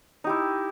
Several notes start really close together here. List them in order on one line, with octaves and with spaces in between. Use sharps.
D#4 G4 E4